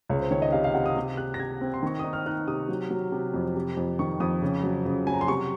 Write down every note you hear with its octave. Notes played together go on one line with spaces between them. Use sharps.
C#2 C#5
C5
D#3 C#5
D#5
C3 F5
F5
C3 F#5
D#6
C3
C3 F#6
A#6
C3 G#6
C4
C6
D#3 C#6
D#4 D#6
F6
D#4 F#6
C3 D#6
F#3
F#3
C3
F2
C3
F2
D#3 C#6
F2 D#6
C#3
F#3
C#3
F#3 G#5
A#5
C6
C3 C#6